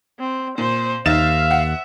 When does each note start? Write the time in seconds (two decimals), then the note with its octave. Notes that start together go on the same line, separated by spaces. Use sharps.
0.20 C4
0.58 A#2 C5
1.06 D#2 D#4 E5 F5 A6 E7
1.51 F#5